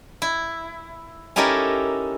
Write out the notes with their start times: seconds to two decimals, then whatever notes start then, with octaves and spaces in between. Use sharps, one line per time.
0.22 E4
1.36 C#4 D#4 E4 G4 A4 A#4